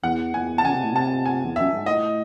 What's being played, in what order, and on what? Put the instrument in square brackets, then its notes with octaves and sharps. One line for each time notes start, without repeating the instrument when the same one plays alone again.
[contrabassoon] E2 [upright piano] F#5
[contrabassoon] E2 [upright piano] G#5
[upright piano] A5
[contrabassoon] C#3 [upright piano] G#5
[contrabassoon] C3
A2
[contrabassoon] C3 [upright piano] A5
[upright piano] G#5
[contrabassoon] E2
[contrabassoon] F#2 [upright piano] E5
[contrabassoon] G#2
[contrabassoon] A2 [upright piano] D#5